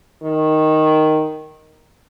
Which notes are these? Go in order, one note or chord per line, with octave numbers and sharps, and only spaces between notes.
D#3